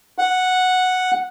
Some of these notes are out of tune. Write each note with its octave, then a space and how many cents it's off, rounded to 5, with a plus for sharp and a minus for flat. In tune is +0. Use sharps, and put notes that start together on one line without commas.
F#5 -5